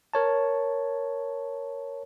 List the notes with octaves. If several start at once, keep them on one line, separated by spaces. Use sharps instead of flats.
A#4 C#5 A5